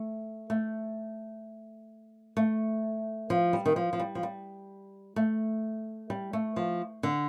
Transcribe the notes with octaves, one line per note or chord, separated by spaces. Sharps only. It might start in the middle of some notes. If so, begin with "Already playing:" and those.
Already playing: A3
A3
A3
F3
G3
D#3
F3
F3
G3
F3
G3
A3
G3
A3
F3
D3